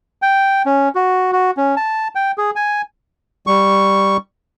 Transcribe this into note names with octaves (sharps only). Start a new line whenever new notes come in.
G5
C#4
F#4
F#4
C#4
A5
G5
G#4
G#5
G3 C#6